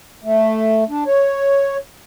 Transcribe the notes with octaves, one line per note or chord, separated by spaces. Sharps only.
A3
D4
C#5